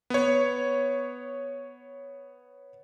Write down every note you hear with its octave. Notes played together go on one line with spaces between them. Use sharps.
B3 C#5